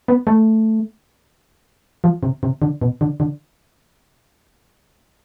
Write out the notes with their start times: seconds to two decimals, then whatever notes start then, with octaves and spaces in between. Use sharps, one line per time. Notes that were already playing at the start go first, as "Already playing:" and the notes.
0.08 B3
0.27 A3
2.04 F3
2.23 C3
2.43 C3
2.62 D3
2.81 B2
3.01 D3
3.20 D3